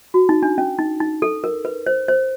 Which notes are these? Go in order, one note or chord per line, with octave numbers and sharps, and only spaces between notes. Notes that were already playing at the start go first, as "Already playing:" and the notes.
F#4
D#4
D4
C#4
D#4
D#4
A4
A#4
B4
C5
C5